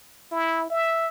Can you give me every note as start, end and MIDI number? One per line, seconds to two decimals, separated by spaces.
0.32 0.67 64
0.70 1.07 76